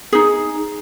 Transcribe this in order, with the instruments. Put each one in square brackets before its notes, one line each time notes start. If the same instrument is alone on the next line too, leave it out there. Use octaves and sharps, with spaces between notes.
[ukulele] D#4 G#4